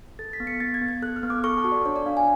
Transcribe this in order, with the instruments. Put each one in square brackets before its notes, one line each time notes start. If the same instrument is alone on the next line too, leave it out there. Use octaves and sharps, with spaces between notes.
[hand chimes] A4 A6
B6
B3
C#7
B3 A6
G#6
B3
G#6
A4 F#6
F6
B3
D6
A4 C#6
A5
F#4
D5
D4 C#5
D5
D4 F5
G#5